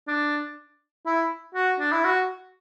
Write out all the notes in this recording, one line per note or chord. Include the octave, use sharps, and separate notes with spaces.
D4
E4
F#4
D4
E4
F#4